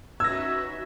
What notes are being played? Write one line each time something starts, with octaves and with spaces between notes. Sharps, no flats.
C#4 D#4 F#4 B4 E5 E6 G#6 A#6